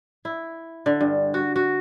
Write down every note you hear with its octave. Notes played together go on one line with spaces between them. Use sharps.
E4
D3
G2
F#4
F#4